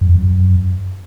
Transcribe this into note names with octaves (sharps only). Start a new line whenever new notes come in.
F#2
F2
F#2